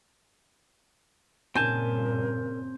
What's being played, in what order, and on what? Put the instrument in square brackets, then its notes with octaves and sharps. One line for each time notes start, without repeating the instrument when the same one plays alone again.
[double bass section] G2 A#2 C#3 [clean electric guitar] C4 G#5 A5 [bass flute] A#4 [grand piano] G6